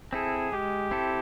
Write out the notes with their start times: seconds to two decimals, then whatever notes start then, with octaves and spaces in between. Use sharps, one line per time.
0.13 C4 E4 G#4 A4
0.52 G#3 G4
0.91 C4 E4 A4